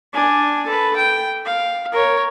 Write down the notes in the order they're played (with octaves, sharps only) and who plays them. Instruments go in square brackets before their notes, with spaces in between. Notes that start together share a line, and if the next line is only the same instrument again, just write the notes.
[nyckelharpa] D4 G#5
A4 B4
G5
F5
A#4 C#5